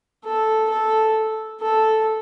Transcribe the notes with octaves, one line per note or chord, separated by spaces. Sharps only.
A4
A4
A4